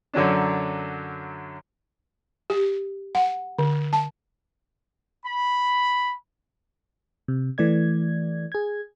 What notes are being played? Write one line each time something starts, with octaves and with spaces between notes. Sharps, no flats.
F#2 D3 F#3 C#4 D4
G4
F#5
D3
A5
B5
C3
E3 A3 D5 G#6
G#4 G#6